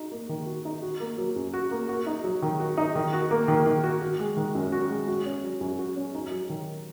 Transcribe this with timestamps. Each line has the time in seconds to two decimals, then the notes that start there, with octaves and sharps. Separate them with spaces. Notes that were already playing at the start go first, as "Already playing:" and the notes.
Already playing: D#4 F#4
0.12 A#3
0.29 D#3
0.46 F#4
0.65 D#4
0.82 F#4
1.00 A#3
1.18 F#3
1.36 F#2
1.54 F#4
1.71 A#3
1.89 F#4
2.07 D#4
2.24 F#3
2.42 D#3
2.60 F#4
2.77 D#4
2.95 D#3
3.13 F#4
3.31 A#3
3.48 D#3
3.66 D#3
3.84 F#4
4.02 F#4
4.19 G#3
4.37 D#3
4.55 F#2
4.72 F#4
4.90 G#3
5.08 F#4
5.26 C#4
5.44 F#3
5.61 F#2
5.79 F#4
5.96 C#4
6.14 D#4
6.31 F#3
6.50 D#3